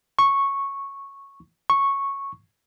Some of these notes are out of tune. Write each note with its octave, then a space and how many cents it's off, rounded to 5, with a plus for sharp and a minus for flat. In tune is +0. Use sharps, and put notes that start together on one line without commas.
C#6 -10
C#6 -10